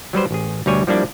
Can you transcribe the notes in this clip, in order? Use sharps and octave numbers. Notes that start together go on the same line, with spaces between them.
F#3 G3 B4 C5
A1 G#4
D2 B2 G3 C#5 G#5
F3 G3 A#3 D4 E4